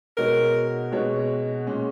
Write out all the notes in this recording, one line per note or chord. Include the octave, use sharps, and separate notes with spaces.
B2 G#3 D#4 F#4 A#4 C#5
B2 G#3 D#4 F#4 C#5
A#2 G#3 C#4